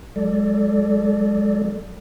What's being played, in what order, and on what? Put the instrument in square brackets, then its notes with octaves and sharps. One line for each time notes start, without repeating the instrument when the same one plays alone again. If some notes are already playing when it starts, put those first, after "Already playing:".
[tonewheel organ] F#3 G#3 A4 D5